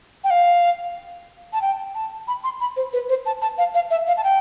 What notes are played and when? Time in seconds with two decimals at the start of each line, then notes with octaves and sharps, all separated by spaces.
0.24 G5
0.30 F5
1.53 A5
1.62 G5
1.95 A5
2.28 B5
2.44 C6
2.61 B5
2.77 C5
2.93 B4
3.09 C5
3.26 A5
3.42 A5
3.58 F5
3.74 F5
3.91 E5
4.07 F5
4.17 A5
4.24 G5